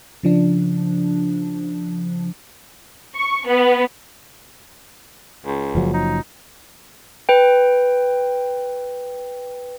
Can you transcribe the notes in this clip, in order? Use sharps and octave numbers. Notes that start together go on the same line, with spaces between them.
C#3 F3 D4
C#6
B3
C#2
F#1 F3 F#3
D#4
B4 G5